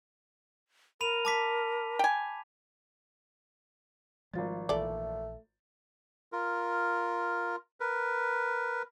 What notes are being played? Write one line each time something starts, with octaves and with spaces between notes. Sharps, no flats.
A#4 B5 D#7 F7
A5 D6 B6
G5 G#5
G#1 F3 G3 F4 A6
A#1 E3 A3 A4 D5
F4 A#4
A#4 B4